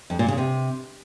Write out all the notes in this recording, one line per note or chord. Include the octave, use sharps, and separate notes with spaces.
F2
A#2
C#3
C3